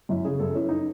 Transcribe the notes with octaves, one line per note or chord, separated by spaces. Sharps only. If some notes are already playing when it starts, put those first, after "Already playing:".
F#2 E4
C#3 G#4
F#2 A4
E3 C#4
D#4